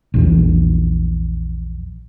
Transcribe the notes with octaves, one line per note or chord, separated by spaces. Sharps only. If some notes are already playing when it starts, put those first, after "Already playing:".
A#1 E2